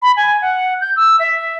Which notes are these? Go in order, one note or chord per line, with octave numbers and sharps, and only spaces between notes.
B5
G#5
F#5
G6
E6
E5